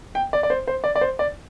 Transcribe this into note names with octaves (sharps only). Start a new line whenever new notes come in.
G5
D5
D5
C5
C5
D5
D5
C5
D5